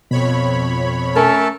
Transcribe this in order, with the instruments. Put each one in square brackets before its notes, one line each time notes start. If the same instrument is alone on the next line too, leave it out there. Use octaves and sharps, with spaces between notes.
[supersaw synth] F2 C#5 B5 [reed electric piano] B2
[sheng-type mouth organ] A3 A4 A5 [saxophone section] C#4 A#4